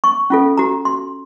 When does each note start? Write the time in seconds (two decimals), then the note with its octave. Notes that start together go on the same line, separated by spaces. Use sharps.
0.04 C#6
0.30 C#4 F4 A4
0.58 F#4 A#5
0.85 C6